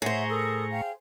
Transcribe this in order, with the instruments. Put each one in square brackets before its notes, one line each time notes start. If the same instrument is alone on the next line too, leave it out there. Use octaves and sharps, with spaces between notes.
[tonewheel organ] A2 A#5 C#6 [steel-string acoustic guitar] G#4 C5 [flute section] C#5 E5 F#5
[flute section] A4 A#4 D#6
F5 G5